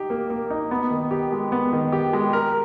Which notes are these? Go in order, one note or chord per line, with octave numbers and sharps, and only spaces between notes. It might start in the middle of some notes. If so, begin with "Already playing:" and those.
Already playing: D#4 G4
A#3
A#3
D#4
B3
D#3
G4
G#3
B3
D#3
G4
G#3
A#4